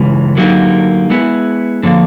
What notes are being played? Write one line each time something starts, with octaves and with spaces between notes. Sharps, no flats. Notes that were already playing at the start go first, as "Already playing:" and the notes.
Already playing: C#3 E3 G#3
D3 F#3 A#3 D#4 G4
G#3 B3 E4 G#4
D3 F3 A#3